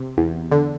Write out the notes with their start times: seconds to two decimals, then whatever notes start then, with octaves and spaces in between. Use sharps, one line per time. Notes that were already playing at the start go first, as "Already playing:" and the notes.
Already playing: C3
0.17 E2
0.51 D3